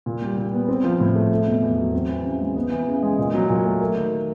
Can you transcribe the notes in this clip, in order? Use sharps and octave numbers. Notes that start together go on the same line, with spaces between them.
A#2
G3
A#2
B3
C4
F3
A2
A3
A3
B2
E2
F#3
C4
E3
C#3
G#3
B3
E3
C#3
G#3
A#2
F#3
A#2
A3
A#3
D#3